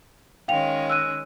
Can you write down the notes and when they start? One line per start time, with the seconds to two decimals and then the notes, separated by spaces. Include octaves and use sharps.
0.48 D#3 G#3 C#4 F5 G5 F7
0.89 E6 F#6 D#7